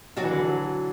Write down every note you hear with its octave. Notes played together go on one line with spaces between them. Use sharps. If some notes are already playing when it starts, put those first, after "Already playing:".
F#3 D4 F#4
E3
D3
E3
F#3